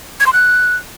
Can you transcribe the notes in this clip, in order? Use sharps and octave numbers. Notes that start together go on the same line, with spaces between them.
G#6
C6
F#6